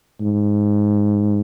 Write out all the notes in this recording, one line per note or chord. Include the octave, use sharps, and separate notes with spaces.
G#2